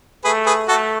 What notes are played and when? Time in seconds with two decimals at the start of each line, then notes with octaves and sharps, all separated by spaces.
0.24 A3 G#4 B4
0.46 G#4 B4
0.68 A3 F#4 A4